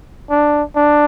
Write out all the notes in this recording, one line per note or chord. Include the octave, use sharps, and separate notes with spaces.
D4
D4